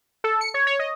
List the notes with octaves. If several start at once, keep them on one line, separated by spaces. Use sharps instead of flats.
A4
C#7
C#5
C#5
D#5